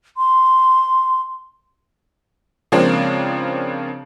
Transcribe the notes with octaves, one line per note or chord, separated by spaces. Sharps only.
C6
C#3 F3 G#3 A#3 C4 D4